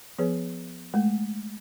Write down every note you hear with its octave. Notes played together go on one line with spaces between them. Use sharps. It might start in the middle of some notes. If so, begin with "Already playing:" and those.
F3 B3 G#4 B4 C#5
G#3 A3